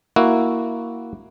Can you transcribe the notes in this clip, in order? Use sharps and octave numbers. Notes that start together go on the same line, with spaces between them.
A#3 E4 F#4